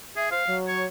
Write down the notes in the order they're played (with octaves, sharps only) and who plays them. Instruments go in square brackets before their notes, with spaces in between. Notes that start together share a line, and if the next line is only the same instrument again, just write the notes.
[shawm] G#4 [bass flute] E5
[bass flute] C5 [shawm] F5
[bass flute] F#3
[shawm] C#5